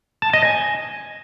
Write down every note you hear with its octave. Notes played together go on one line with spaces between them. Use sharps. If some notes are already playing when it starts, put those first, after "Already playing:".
A5
D#5
G#5